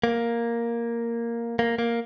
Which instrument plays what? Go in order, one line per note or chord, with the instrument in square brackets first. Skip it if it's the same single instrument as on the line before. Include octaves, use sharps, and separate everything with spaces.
[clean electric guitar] A#3
A#3
A#3